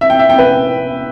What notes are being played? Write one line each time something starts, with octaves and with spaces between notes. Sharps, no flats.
E5
G5
E5
G5
B4